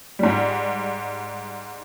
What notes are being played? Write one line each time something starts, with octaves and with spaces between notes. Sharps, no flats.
G#2 G3